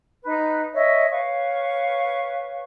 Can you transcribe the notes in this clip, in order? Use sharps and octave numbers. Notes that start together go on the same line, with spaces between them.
D#4 B4
C#5 D#5 E5
B4 C#5 F5 C#6